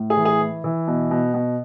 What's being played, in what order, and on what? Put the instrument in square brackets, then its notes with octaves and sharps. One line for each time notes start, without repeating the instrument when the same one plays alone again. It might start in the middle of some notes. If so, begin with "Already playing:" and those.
Already playing: [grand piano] A2
G#4
E3
G#4
E3
E3
B2
B2
B2